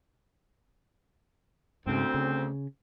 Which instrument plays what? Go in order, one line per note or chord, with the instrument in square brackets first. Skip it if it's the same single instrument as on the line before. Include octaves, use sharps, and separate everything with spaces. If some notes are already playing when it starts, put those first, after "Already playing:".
[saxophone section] D2 C4 [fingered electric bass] G#2 C#3
[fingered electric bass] C#3